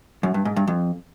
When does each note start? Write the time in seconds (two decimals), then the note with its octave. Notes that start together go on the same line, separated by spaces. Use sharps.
0.23 F#2
0.34 G2
0.45 G#2
0.56 G2
0.67 F2